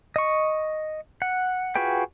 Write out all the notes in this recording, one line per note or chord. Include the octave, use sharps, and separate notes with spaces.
D#5 C#6
F#5
F4 F#4 G#4 B4 G5